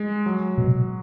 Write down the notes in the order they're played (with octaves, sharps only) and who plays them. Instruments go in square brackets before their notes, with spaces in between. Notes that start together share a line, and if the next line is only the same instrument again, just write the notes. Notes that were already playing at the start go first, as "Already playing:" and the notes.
Already playing: [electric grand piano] G#3
F#3
[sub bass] B2